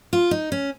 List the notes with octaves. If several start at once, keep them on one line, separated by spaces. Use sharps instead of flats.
F4
D#4
C#4